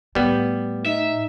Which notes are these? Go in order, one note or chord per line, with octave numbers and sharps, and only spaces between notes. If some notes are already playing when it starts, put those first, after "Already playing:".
A2 G3 B3
D#4 E5